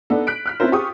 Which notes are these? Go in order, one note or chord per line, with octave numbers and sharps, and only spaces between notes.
B3 D4 D#4 A4
F#6 B6 D7
F6 F#6 B6
C4 C#4 E4 F4 A#4 C5
F4 G4 G#4 C#6 D#6